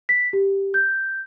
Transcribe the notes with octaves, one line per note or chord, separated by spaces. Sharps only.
B6
G4
G6